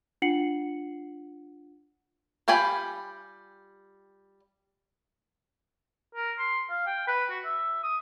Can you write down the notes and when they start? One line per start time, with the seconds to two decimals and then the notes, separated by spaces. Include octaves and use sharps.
0.22 D4 F4 F#5 C7 C#7 F#7
2.48 G3 F4 G5 G#5 B5
6.15 A#4
6.39 C6
6.69 F5
6.87 G5
7.07 B4
7.30 F#4
7.45 E5
7.83 D#6